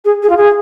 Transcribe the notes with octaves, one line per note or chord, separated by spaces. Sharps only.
G#4
G#4
F4
G#4